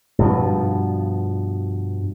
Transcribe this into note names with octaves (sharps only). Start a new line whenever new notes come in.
G2 B2 F3